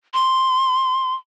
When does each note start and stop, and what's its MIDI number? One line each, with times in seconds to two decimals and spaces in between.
0.14 1.15 84